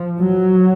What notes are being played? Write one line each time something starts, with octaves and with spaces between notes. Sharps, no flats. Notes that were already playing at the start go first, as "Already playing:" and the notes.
Already playing: F3
F#3